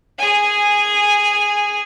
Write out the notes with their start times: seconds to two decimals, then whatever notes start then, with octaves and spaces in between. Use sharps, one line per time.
0.18 G#4 G#5